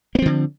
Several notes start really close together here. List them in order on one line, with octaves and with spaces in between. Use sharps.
A#3 C4 F3 D3